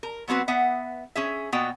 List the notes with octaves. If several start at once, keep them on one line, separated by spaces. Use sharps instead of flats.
A#4
F#3 B3 C4 F#4 B4
B3 E5 F#5
C#4 G#4 E5
A#2 B3 F#4 D#5 G5